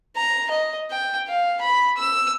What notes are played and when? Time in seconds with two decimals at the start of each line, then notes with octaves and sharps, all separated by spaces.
0.17 A#5
0.50 D#5
0.91 G5
1.28 F5
1.61 B5
1.97 E6